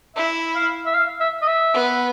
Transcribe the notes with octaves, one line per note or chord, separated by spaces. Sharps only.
E4 E5
F5
E5
F5
E5
D#5
E5
B3